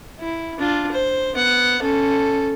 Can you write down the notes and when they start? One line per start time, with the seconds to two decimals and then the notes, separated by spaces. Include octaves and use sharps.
0.19 E4
0.58 D4 F4
0.91 C5
1.34 B3 F#5
1.81 C#4 A4